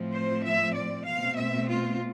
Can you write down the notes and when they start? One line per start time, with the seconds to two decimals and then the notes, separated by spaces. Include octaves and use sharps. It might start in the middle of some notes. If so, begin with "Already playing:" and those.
Already playing: A2 F3 A3 C4
0.14 C5
0.44 E5
0.76 D5
1.06 B2 A3 C4 F5
1.37 E5
1.69 F4